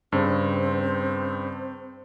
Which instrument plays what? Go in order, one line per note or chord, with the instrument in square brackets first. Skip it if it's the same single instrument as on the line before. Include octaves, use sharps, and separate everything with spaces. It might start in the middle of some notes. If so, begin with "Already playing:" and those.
[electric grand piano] G2 C#3 [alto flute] C4